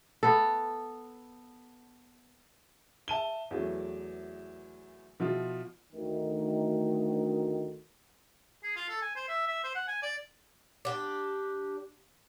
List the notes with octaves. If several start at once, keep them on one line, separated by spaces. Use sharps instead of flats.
B3 A4
E5 A5 D#7 G7
E2 E3 F#3 A3
B2 F3 E4 F4
D2 D#3
G#4
F4
A4
G#5
C5
E5
E5
C5
F#5
G#5
D5
D4 G4